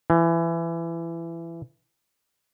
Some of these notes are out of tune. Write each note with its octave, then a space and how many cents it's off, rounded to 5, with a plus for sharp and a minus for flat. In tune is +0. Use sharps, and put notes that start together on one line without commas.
E3 +20